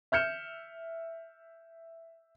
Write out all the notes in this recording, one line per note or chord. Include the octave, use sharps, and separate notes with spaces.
E5 F6 G6 C#7 E7